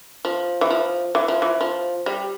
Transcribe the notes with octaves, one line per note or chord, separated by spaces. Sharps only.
F3
E3
F3
E3
F3
E3
F3
G3